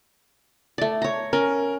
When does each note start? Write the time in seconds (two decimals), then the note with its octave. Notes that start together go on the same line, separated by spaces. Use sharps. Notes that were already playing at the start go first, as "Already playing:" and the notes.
0.78 A3 D5
1.02 C#5 A#5
1.33 C#4 A#4